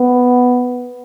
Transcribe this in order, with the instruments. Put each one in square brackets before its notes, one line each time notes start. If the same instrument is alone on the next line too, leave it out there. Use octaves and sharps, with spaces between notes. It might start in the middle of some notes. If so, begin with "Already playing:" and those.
Already playing: [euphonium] B3